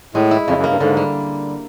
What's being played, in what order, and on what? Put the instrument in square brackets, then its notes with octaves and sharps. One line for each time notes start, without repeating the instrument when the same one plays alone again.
[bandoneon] A2 [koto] G#3
[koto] E4
[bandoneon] F2 [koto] C#3
[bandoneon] F#2
[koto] A#3
[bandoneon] G2
[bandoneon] G#2 [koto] D3
[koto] G3